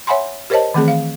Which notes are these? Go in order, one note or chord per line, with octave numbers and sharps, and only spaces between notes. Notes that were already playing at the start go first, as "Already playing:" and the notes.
C#5 E5 F#5 G#5 B5 C6
G4 A#4 C5 C#5 D#5 A5
D#3 E3 A3 C4 G#4
F5